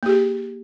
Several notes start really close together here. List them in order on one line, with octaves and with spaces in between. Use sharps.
A#3 G4 G#4